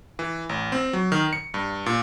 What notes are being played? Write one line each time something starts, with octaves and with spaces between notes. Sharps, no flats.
E3
A1
C4
F#3
D#3
C#7
G2
A#2